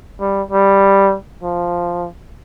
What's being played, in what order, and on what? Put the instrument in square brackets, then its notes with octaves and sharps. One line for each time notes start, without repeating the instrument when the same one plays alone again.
[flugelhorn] G3
G3
F3